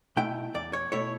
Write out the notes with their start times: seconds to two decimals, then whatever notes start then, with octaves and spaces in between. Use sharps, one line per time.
0.17 B2 A3 E4 G5
0.54 E2 D5
0.73 C#5
0.92 B2 A3 E4 C#5